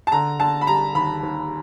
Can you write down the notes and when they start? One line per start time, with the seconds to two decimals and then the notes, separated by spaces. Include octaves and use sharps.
0.07 A5
0.12 D3 A#5
0.39 D3 A5
0.61 B5
0.67 G3 A#5
0.95 D#2 B5
1.23 D#2